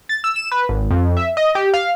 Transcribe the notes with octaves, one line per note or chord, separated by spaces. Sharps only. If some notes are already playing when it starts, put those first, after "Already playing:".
A6
E6
E7
B4
G#1
F2
E5
D#5
G4
F5